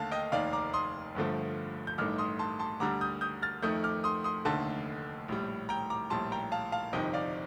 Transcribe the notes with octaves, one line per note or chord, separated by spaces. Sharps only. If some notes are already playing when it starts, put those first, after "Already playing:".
Already playing: D#2 D3 A3 F5 A5
D#5 G5
F1 D#2 D#3 D5 F5
A#5 D6
C6 D#6
G1 G2 D3 F3 A3
G6
A1 G2 D#3 A3 D6 F6
C6 D#6
A5 C6
A5 C6
D2 D3 G3 A#5 D6
D#6 G6
D#6 G6
F6 A6
F2 D#3 A3 D#6 G6
D6 F6
C6 D#6
C6 D#6
F1 D#2 D3 A3 A5 C6
A#1 A2 G3
G5 A#5
A#5 D6
A#1 A2 G3 A5 C6
G5 A#5
F5 A5
F5 A5
G1 F2 C3 D#3 D#5 G5
D5 F5